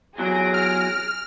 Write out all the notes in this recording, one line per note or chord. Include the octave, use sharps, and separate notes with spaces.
E2 F#3 G#4 A#6 D7
F6